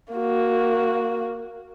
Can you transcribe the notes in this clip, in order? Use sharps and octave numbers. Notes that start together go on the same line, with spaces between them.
A#3 F#4